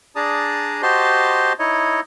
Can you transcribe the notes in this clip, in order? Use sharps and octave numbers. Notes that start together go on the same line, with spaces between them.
D4 G#4 D5 A5 A#5 D#6
F#4 G4 C5 D#5 A5 C6
D#4 E4 C#5 D#5